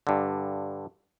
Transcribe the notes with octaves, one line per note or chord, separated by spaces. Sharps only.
G2 D3